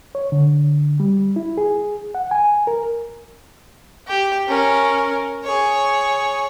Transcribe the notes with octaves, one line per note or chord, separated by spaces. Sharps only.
C#5
D3
G3
E4
G#4
F#5
G#5
A#4
G4
C#4 A#4
G#4 C#5